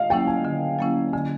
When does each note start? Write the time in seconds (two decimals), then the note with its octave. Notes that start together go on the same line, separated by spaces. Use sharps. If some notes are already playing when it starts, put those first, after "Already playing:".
Already playing: D#5 F5
0.10 F#3 A#3 C#4 E4 G5
0.27 G#5
0.45 D3
0.79 F#3 A#3 C#4 E4
1.13 D3 G#5